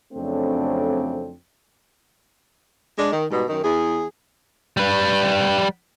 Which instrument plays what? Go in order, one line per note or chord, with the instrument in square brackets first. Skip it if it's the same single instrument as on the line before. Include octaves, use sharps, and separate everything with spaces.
[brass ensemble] F2 C#3 F#3 A3 C4 D4
[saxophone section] G#3 D4
D#3
G#2 B2 G3
F#2 D#3
E2 G#4
[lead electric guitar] G3 B4